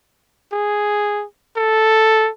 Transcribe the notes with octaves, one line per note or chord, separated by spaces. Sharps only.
G#4
A4